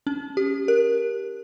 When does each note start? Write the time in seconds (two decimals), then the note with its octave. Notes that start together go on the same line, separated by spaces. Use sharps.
0.07 C#4
0.37 G4
0.68 A#4